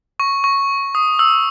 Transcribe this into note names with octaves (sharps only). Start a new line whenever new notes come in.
C#6
C#6
D#6
E6